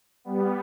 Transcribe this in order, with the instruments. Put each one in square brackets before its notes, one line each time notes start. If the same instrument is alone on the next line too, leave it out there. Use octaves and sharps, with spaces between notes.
[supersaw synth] G3 B3